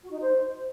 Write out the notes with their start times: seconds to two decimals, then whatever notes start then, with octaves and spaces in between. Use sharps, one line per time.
0.03 F#4
0.11 D#4
0.20 C5